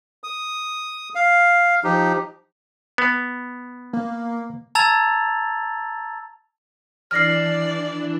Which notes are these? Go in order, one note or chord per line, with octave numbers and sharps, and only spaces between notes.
D#6
F5
F3 D#4 G4
B3
A#3
A5 A#5 E6 G#6 A6 F7
E3 D4 D5 F6 A#6 C7